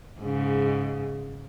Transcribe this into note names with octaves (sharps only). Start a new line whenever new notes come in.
G#2 C#3